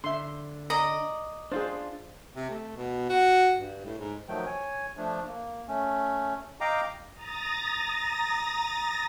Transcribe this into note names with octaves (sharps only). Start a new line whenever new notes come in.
D3 E5 C6
D5 D#5 A#5
D4 F4 G#4 C5
C3
A3
B2
F#4
G2
A2
G#2
D#3 F3 F#3 A3 G5
C#5 G#5
F3 A3 D4
A#3
A3 C#4
D#5 F5 G5 A#5 D6
A#5 D#6 A6 A#6